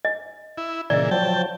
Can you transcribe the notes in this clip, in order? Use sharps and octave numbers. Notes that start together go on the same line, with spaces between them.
D#5
E4
A#2 C#3 E3 D5 D#5
F3 F#3 G5 A5